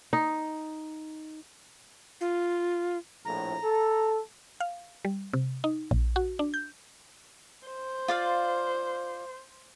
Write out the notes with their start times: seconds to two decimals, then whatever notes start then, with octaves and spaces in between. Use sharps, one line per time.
0.13 D#4
2.21 F4
3.25 A#1 A2 A#5
3.63 A4
4.60 F5
5.05 G3
5.34 C3
5.64 D#4
5.91 A#1
6.16 F#4
6.39 D4
6.54 G6
7.67 C5
8.08 F4 D5 F5